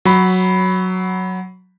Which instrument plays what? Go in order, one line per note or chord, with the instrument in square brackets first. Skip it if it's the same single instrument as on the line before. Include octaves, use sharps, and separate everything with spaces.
[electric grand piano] F#3 B5